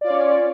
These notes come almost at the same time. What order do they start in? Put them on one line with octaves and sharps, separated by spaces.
D5 F4 C#5 C#4